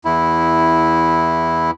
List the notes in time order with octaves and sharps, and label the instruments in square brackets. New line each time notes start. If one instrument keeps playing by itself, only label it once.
[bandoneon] E2 E4